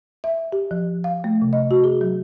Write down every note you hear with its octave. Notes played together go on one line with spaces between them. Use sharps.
E5
G4
F3
F5
A3
C3
D#5
F#4
G#4
F#3